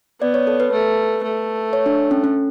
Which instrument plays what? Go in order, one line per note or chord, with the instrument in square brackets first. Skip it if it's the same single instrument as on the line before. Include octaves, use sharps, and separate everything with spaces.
[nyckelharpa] B3 [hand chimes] D5
[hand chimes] C#5
A4
B4
[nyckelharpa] A3
A3
[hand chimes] C#5
D4
C#4
C#4